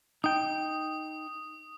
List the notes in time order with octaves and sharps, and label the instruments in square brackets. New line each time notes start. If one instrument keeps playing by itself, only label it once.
[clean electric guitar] D#4 G5 [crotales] D#6